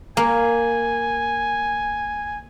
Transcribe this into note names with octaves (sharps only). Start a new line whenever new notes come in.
A#3 G#5